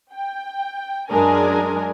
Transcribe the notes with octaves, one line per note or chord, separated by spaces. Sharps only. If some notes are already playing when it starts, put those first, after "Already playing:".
G5
F#2 G#3 D4 A#4 G#5